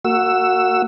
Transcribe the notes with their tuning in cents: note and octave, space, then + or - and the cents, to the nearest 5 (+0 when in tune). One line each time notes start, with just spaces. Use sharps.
A#3 -30 F#4 +0 E6 +5